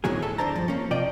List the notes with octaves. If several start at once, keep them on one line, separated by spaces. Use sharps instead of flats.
D2 A2 D#3 F#3 G#4
A4 E5 A5
D2 G2 D4 C5 A5 A#5
G2 F3
A#3 C#4
C3 F4 D5 D#5 G5